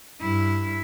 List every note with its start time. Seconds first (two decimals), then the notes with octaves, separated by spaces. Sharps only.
0.21 G2 E4